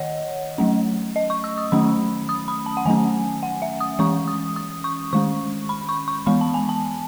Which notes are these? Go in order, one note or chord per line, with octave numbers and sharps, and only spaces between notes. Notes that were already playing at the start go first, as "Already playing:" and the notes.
Already playing: D#3 C#5 D#5 F#5
F#3 A3 C#4
D#5
C#6
E6
D#6
D#3 F#3 A3 C#4 B5
D#6
B5
A5
F#5
D#3 F#3 A3 C#4 G#5
F#5
E5
D#6
E3 G#3 C#4 C#6
D#6
D#6
C#6
D#3 G#3 C#4 C#6
B5
C#6
C#6
E3 G#3 B3 B5
A5
G#5
A5